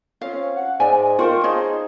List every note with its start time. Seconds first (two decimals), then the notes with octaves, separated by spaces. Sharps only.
0.22 C4 C#4 F4 F5
0.57 F#5
0.80 G#2 D5 E5 G#5
1.19 F4 A#4 C5 F5 G5 C#6
1.43 D#4 G#4 C5 C#5 D#5 A5